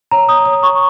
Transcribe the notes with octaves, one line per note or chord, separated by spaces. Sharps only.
C#5 A#5
D#6
C#5 D#6
C#6